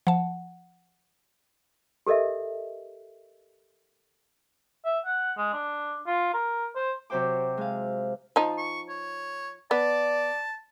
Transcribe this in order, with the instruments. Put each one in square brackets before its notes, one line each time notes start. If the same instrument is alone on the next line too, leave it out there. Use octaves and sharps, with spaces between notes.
[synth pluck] F3 A5 [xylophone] F#5
[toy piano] G4 A4 A#4 D#5 E5
[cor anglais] E5
F#5
G#3
D4
F4
A#4
C5
[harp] C3 F#3 C5 G5 D6
G#3 F5
[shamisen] F3 D#4
[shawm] C#6
C#5
[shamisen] B3 [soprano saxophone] D5 [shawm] A5